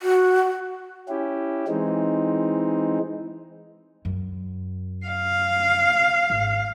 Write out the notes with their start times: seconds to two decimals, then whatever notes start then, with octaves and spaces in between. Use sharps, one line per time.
0.02 F#4
1.09 C#4 E4 G4
1.68 E3 G#3 C4 D#4
4.05 F#2
5.06 F5
6.30 G#1